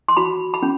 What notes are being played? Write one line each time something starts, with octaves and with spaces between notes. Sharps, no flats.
C6
F#4 B5
B5
C#4